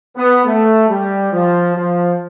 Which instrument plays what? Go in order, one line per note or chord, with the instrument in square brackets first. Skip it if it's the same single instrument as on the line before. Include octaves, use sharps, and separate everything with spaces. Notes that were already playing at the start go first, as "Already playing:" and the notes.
[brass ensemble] B3
A3
G3
F3
F3